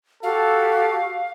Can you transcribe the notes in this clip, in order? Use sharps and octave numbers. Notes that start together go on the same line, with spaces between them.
F#4 G4 A4 F5